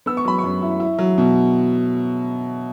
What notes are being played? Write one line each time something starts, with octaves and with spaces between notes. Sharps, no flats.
B3 E6
C#6
F#3 B5
C#6
F#2
E4
E4
F#3
B2